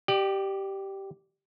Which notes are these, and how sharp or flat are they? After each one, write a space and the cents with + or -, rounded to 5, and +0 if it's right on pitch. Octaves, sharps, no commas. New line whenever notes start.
G4 -10 D5 +35